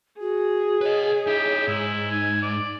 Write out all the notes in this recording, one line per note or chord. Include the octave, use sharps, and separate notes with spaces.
F#4 G#4
B4 C#5 D#5
D#4 E4 G4
G#2 E4
D#4 G#5
D5